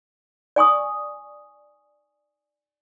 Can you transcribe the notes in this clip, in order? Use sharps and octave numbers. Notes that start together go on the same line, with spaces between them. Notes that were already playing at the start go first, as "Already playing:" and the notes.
D5 G#5 C#6 D#6